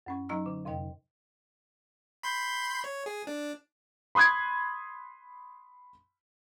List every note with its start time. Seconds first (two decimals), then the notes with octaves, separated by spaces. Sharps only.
0.06 F#2 C#4 C#6
0.29 F#3 D#4 D#5 A#5 E6
0.46 D3
0.65 F2 C3 D#5 G5
2.23 B5 C6 G6
2.84 C#5
3.06 G#4
3.27 D4
4.15 B5 C6 D#6 F#6 G#6